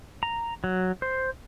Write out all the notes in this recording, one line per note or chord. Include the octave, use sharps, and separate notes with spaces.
A#5
F#3
C5